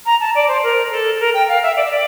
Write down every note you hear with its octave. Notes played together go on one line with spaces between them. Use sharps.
A#5
A5
D5
C5
A#4
A4
A4
A#4
G5
F5
E5
D5
E5
D5